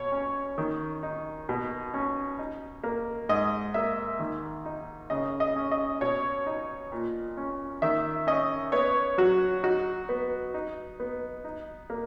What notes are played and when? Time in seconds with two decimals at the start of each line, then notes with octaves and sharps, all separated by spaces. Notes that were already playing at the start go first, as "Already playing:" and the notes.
Already playing: B2 C#5
0.12 C#4
0.58 D#3
1.03 D#4
1.49 B2
1.94 C#4
2.39 D#4
2.84 A#3
3.29 G#2 D#5
3.74 A#3 E5
4.19 D#3
4.66 D#4
5.10 C#3 D#5
5.40 D#5
5.56 C#4
5.71 D#5
6.01 B2 C#5
6.47 D#4
6.92 A#2
7.37 C#4
7.82 D#3 E5
8.27 C#4 D#5
8.72 B3 C#5
9.18 F#3 F#4
9.63 D#4 F#4
10.09 B3
10.54 D#4
11.00 B3
11.45 D#4
11.90 A#3